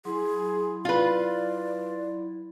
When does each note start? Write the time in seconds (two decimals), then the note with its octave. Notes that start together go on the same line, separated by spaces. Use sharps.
0.05 F#3 E4 G#4 C6
0.85 F4 B4 D5